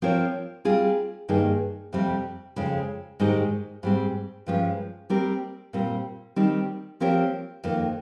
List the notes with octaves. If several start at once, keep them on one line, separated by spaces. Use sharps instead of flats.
F3 C4 F4 A#4 C#5
G3 C4 F4 G#4
G2 D#3 A#3 D#4 G#4
F2 C3 G3 C4
F2 C#3 G#3
G#2 D#3 G#3 D#4 G4
G#2 G3 C4
G2 F3 G#3 C#4
G3 C4 G4 A#4
A#2 G3 C4
D#3 G3 C4 D#4
F3 C4 G4 A#4 C#5
F2 D#3 A#3